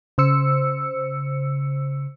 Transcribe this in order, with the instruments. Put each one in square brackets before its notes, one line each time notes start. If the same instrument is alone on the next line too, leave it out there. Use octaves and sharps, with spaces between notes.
[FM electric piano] C#3 C5 E6 C#7